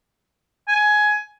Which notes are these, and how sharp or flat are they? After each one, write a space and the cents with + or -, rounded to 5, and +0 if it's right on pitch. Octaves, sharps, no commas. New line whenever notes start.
G#5 +15